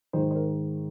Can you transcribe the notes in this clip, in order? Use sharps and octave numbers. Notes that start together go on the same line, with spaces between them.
G#2 D#3 C5
C5
A#4